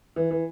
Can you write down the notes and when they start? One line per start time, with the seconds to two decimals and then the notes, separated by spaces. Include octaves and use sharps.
0.16 E3
0.31 E3